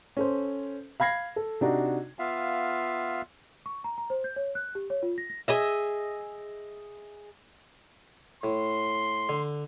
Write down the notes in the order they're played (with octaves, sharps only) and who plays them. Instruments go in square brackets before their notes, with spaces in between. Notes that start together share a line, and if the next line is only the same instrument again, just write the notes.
[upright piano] C#4 A4 C5
F5 B5 G#6 A#6 C7
A4
C3 D4 D#4 F#4
[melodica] B3 F4 E5 F5
[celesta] C#6
A#5
A#5
C5
G6
C#5
F#6
G4
C#5
F4
A#6
A#6
[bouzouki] G#4 D#5 E5
[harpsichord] A2 [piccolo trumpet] C6
[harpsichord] D3